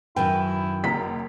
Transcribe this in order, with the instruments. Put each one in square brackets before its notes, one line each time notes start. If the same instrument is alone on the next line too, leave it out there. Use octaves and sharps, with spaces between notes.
[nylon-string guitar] F#2 D#3 B4 [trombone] E4 [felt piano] G5
[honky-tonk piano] F#1 A#5 [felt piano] B6